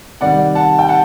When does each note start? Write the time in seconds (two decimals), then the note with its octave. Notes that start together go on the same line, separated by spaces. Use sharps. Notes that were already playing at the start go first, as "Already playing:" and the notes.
0.21 C3 D#3 G3 D5 F#5
0.55 F#5 A5
0.79 G5
0.89 F#5 A5